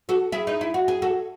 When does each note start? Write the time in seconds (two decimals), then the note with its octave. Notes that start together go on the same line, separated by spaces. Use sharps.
0.09 F#4 A4
0.32 E4 G#4
0.47 D#4
0.61 E4
0.74 F#4
0.88 G#4
1.02 F#4 A4